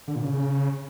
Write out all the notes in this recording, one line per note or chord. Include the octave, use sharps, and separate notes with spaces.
D3
A#2
C#3